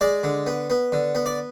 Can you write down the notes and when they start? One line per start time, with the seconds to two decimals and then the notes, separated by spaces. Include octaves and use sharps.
0.01 G#3 D5
0.24 D3
0.47 B3
0.70 B3
0.92 D3
1.15 B3
1.26 D5